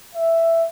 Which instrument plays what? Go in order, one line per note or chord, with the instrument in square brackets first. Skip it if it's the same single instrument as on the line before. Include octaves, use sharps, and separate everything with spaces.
[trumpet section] E5